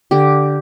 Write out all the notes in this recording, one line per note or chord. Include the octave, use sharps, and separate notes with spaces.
D3 G4